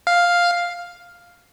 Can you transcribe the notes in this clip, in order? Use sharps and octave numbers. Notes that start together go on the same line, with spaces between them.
F5